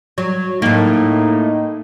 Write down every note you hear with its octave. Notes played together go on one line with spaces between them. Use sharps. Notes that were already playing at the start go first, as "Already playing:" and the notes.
F#3
A2 A#3 D#4